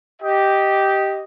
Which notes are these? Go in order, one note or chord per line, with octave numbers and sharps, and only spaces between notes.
G4 D#5